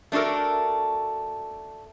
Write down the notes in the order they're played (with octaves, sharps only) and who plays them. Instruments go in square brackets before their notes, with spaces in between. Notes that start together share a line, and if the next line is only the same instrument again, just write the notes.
[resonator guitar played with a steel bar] A3 D4 F#4 A4 A#4